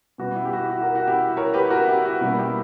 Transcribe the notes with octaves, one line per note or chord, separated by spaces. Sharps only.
B2 G3 B3 F#4
E4
G4
F#4
F#4
F#4 A#4
F#4
E4 G4
A#4 C#5
G4 B4
F#4 A#4
E4 G4
F#4
B2 G3 A#3 E4
E4 G4